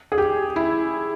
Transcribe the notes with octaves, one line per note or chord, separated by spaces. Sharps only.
G#4
G4
E4